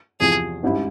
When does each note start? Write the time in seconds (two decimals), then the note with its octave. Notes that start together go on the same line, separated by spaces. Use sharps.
0.20 E2 C3 F3 G#4
0.63 G#1 G#2 G3 C#4 E4